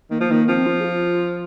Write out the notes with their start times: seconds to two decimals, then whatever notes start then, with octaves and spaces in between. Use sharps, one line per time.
0.10 D#3 A#3
0.20 F3
0.30 D#3 A#3
0.48 F3 C4
0.66 F4
0.80 G#4
0.85 F4